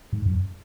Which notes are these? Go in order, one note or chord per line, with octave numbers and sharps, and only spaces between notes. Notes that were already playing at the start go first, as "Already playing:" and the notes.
G#2
F#2